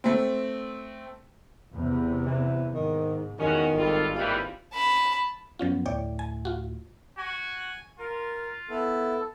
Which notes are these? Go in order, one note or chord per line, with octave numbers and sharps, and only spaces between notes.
A3 C4
E2 C3
E3
G#2 D#3
E2 D#3 G#3 C#4 F#4
G#1 G3 F4 A4
D#2 E3 G3 F4
A5 B5
F#2 F3 B3 C#4 F4
D2 A2 A3 C#5 D5 G5
G#5
F4 F#4
F#4 G#5
F4 A#4
B3 E4 A4